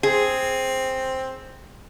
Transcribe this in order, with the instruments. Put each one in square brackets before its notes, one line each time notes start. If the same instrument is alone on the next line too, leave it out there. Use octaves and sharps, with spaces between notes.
[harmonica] C4 [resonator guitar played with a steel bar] G#4